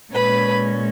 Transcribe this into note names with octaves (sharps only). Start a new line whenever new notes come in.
A#2 G#3 C#4 B4 B5